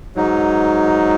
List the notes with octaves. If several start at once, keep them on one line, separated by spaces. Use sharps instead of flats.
G#2 F#3 D#4